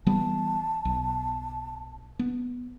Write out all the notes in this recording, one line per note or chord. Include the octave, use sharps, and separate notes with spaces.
E3 G3 B3 A5
B1
B3